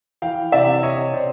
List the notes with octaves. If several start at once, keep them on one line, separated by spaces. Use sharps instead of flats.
E3 F5 G5
C3 D5 E5
C3 C#5 D#5
C3 C5 D5